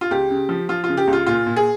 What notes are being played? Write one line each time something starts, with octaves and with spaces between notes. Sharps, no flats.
F4
C#2 G4
C#3
F3
F3 F4
C#3 F4
G4
C#2
F4
A#2 F4
A#2
G#4